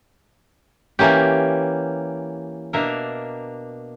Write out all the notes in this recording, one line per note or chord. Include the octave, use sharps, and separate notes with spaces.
E3 A#3 C#4 G4
B2 A#3 D4 A#4 E5